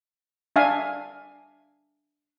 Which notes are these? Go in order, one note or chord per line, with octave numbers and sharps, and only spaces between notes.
D4 E5 F5 G#5